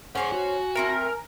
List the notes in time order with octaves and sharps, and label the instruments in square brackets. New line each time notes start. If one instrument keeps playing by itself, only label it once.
[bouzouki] C#4 C5 C#5 [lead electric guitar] G#4 F#5 [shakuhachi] G#5
[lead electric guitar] F#4
[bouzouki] A3 C4 E4 [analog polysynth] A#4